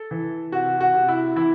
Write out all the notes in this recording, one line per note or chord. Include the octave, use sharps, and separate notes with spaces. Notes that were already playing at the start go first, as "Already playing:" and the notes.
Already playing: A4
E3
C3 F#4
F#4
C3
E4
E3 E4